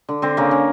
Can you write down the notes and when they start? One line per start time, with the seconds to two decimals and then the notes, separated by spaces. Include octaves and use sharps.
0.09 D3
0.22 D3 C4
0.37 C#3 A#3
0.51 C#3